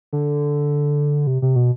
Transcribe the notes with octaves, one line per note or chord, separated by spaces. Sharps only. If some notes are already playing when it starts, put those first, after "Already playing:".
D3
C3
C3
B2